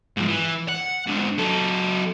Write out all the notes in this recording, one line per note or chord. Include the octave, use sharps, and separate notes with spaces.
G#2 F3
E3
F#5
G#2 D3
F#3 A4